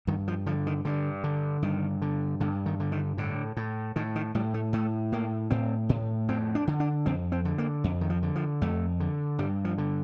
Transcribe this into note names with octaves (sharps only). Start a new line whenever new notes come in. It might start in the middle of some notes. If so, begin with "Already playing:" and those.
G2 D#3
F3
D3 F3
D#3
G2 D3
D3
G2 D#3
D3
G2 D3
D#3
D3
D#3
A2 D3
A2
A2 D#3
D#3
A2 G3
A3
A2 A3
A2 A#3
A2 C4
A2
F2 C4
D4
D3
D4
F2 C4
C4
D3
A#3
F2
D#3
F3
D3
F3
F2 A3
D3
G2 G3
F3
D3